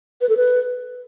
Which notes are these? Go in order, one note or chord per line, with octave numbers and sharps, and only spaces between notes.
B4
A4
B4